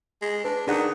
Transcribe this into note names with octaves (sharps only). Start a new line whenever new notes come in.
G#3
D4 B4
D#3 D4 G#4 F#5